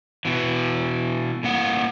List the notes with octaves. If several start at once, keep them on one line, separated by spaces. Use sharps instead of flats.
B2 E3
A2 A#3 F#5